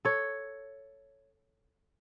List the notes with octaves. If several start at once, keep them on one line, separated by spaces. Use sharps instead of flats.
A4 C#5